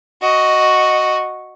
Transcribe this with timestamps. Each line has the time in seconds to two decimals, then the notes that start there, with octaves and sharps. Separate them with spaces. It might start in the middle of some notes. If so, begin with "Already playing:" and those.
0.22 F#4 D#5